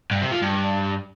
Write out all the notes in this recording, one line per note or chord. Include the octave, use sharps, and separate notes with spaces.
G2
C3
F3
G2